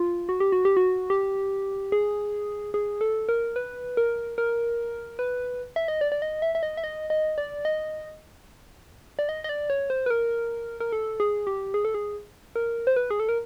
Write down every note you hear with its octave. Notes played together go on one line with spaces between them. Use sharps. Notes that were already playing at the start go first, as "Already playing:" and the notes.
Already playing: F4
F#4
G4
F#4
G4
F#4
G4
G#4
G#4
A4
A#4
B4
A#4
A#4
B4
E5
D#5
D5
D5
D#5
E5
E5
D#5
E5
D#5
D#5
D5
D#5
D5
D#5
D#5
D5
C#5
C5
B4
A#4
A#4
A4
G#4
G4
G#4
A4
G#4
A#4
C5
B4
G#4
A4
A#4